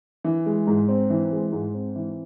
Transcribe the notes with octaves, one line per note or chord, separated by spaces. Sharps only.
E3
G#3
G#2
C4
E3
G#3
G#2
C4
E3